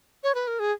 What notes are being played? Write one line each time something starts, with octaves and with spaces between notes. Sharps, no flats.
C#5
B4
A#4
G#4